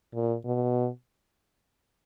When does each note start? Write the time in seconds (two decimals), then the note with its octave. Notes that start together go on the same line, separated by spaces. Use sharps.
0.14 A#2
0.45 B2